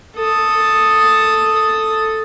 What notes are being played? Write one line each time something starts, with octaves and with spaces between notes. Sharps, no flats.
A4 D#6